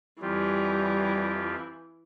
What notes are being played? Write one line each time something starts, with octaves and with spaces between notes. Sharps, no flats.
F2 E3 G3 F4 G4